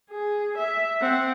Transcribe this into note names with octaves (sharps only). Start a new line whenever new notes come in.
G#4
E5
C4 F#5